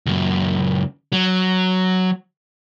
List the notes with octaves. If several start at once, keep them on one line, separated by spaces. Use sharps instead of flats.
C#2 F#2
F#3